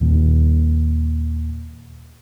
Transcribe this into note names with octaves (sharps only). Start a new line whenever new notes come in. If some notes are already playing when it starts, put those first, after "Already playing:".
D#2 A#2